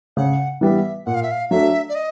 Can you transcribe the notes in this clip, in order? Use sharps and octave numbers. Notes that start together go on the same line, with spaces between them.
C#3 F#5
E3 G3 B3 E5
A#2 F#5
F5
E5
F5
F#3 A3 D4 E5
D5
D#5